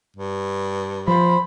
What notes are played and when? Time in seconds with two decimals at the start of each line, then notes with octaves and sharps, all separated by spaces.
0.16 G2
1.08 F3 C5 B5